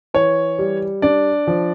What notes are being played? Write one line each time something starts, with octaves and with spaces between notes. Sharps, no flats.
E3 C#5
G3
D4 D5
F3